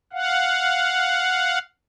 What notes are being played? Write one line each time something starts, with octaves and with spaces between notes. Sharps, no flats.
F5 F#5